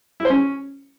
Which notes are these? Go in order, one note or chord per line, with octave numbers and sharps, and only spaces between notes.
E4
C5
C#4